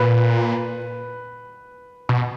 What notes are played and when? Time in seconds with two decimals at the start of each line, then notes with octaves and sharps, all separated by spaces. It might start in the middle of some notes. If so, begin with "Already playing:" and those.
Already playing: A#2 B4
2.09 B2